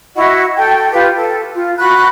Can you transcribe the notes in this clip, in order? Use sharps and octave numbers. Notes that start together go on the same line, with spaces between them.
E4 F#4 D#5 F#5
A4 G5
F4 G4 B4
A4
F4
F#4 B5 F#6